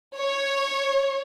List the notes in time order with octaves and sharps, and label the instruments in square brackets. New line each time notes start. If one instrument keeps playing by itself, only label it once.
[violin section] C#5